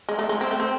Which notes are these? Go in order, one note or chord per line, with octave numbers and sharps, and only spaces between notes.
G#3
A3
G#3
C4
A3
C4